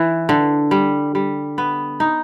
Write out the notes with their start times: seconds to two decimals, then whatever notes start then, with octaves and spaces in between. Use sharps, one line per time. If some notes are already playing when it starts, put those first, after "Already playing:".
Already playing: E3
0.29 D3
0.71 G3
1.15 G3
1.58 B3
2.00 D#4